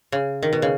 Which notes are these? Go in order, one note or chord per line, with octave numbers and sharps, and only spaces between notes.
C#3
D#3
B2
C#3